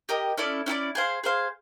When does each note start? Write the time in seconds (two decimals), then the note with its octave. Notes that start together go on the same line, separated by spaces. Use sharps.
0.09 G4 A#4 D#5
0.37 C#4 E4 A4 D5
0.66 C#4 E4 A4 D5
0.95 G#4 C5 F5
1.24 G#4 C5 F5